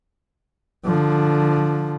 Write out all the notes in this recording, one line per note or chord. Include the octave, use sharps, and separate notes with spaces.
D3 F3